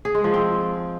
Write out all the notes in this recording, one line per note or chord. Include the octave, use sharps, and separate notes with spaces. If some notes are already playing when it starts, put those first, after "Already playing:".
G#4
G#3
F3
C4